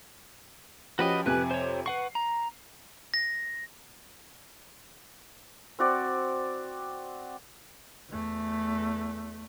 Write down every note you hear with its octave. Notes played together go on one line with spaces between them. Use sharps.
F3 C#4 F#4 G4 B4 D#5
F2 C3 G4 B4 G#5 F#6
C5 C#5
B4 F#5 C#6 C7
A#5
A#6
C4 F#4 D5
E2 A3